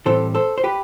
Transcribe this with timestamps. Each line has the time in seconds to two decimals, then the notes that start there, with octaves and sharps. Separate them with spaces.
0.06 A2 E3 G3 C4 A4 C5
0.35 A4 C5
0.58 C5
0.64 G4 B4